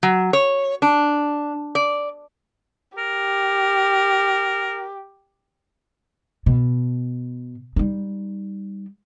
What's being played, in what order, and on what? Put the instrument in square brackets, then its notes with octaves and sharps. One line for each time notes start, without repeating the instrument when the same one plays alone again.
[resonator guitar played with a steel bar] F#3
C#5
D4
D5
[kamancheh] G4 [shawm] A#4
[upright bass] B2
G3 D#4